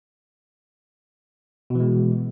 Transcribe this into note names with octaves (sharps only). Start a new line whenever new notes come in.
B2 E3 G#3